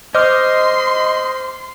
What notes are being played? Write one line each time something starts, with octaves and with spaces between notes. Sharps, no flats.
C5 D#5 C6 D6 F6